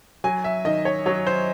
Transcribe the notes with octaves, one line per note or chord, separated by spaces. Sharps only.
F#3 G#5
E5
D#3 D#5
C#5
F#3 C#5
C5